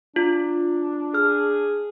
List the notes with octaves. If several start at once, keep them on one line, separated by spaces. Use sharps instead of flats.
D4 F4
G#4 F6